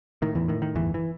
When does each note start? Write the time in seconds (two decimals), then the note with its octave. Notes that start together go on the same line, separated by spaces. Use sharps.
0.22 A2 D#3
0.35 E2 E3
0.48 A2 D#3
0.62 D#3
0.75 G1 E2 E3
0.94 E3